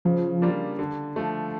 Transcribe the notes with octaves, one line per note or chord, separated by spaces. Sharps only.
C#3 F3
G3 A#3 D4 F4
D3
F3 A3